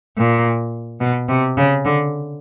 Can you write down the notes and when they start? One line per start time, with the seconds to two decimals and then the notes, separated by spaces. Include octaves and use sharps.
0.17 A#2
1.00 B2
1.29 C3
1.57 C#3
1.85 D3